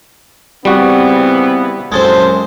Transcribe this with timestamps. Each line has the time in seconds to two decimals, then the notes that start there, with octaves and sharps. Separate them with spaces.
0.65 C#3 E3 G3 B3 C4 F#4
1.92 C2 F#2 A#2 G#3 A4 C5